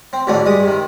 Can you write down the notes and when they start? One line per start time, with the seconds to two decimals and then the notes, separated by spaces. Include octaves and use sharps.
0.13 C4
0.27 A1 G#2 B2 D3 A3 C#5
0.46 G2 G#3 D#6
0.63 C3 D#3